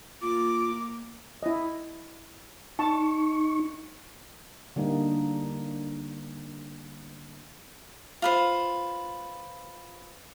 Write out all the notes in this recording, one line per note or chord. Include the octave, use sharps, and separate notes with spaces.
A#3 F4 D6
E4 D#5
D#4 A5 C#6
D3 G3 A#3 D#4
F4 B4 C5